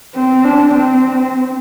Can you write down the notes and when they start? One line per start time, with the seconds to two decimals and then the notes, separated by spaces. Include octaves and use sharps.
0.15 C4
0.44 D4
0.74 C4